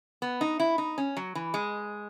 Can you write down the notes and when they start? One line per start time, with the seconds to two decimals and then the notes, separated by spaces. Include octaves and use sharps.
0.22 B3
0.41 D#4
0.60 E4
0.78 D#4
0.98 C#4
1.17 F#3
1.35 E3
1.54 G#3